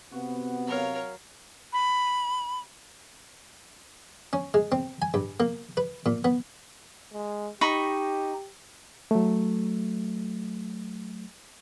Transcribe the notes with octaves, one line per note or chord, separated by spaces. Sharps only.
C3 B3 F#4
F#3 A#4 C#5 F5
B5
C#4
G#3
C4
G#5
G2
A#3
B4
A#2
B3
G#3
D#4 G4 B5 C#6
F#3 A3